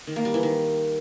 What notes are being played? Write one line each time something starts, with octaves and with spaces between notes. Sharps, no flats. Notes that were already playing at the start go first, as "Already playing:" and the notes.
D#3
A#3
G3
E3
D#3